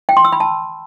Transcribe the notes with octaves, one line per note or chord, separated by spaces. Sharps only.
G5
C6
E6
B5
A5